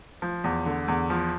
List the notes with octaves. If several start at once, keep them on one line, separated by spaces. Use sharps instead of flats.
F3
E2
D3
E2
F3